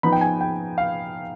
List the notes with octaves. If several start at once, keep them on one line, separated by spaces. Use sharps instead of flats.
F3 B3 D#4 B5
G5
G#5
G5
F5